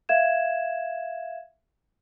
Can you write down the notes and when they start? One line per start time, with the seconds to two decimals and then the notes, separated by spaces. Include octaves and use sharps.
0.09 E5 F5 G#6 E7